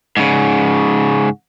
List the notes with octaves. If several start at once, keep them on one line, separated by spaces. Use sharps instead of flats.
G#2 C#3